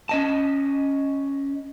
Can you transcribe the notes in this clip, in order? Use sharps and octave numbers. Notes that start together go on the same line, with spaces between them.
C#4 D#5 A5